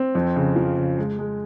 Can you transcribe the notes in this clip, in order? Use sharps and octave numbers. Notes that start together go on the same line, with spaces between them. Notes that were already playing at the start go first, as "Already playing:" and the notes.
Already playing: C4
F2
C#3
F3
C#3
G#3
G#3